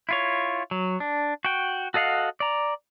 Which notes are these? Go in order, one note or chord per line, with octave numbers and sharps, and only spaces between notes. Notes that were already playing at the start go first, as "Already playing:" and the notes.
E4 F4 C#5
F#3
D4
F#4 G5
F#4 A4 D#5 F5 F#5
D5 A#5